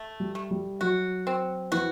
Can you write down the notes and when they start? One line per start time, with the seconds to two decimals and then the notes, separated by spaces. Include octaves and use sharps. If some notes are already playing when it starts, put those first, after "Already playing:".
Already playing: A3
0.20 G3
0.35 A3
0.51 G3
0.81 F#3 F#4
1.27 C4
1.72 E3 F#4